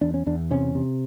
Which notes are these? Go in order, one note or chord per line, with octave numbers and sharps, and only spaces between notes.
E2 D4
C#4
E2 D4
C3 C#4
C3